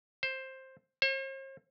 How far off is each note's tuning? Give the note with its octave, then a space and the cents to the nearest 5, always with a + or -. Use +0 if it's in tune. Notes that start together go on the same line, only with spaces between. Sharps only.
C5 +10
C5 +45